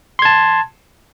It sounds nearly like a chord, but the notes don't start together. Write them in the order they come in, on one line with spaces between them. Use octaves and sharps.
C6 G#6 A5